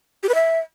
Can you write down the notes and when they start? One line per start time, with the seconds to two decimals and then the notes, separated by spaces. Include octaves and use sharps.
0.23 G4
0.29 B4
0.34 E5